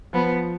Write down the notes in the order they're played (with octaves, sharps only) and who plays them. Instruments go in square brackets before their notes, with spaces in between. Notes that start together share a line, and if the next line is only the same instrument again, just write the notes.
[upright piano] F3 [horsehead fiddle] B3